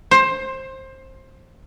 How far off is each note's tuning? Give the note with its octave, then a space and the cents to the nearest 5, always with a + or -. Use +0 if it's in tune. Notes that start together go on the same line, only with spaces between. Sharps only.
C5 +20